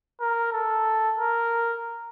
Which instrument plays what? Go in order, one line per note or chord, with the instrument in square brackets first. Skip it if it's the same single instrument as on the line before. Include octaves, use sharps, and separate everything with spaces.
[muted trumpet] A#4
A4
A#4